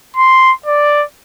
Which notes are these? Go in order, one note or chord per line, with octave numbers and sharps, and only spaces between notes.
C6
D5